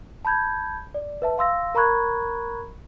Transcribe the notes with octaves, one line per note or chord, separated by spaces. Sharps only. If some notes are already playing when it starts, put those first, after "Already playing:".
A5 B5 G6 G#6
D5
B4 E5 A5
F5 C6 E6 A#6
A#4 A#5 B5 C#6 F#6 G#6